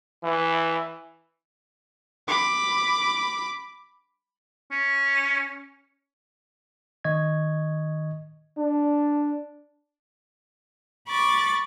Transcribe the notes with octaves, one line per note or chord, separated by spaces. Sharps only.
E3
B5 D6
C#4
D#3 D#5 C#6 G#6
D4
B5 C#6 D6 A6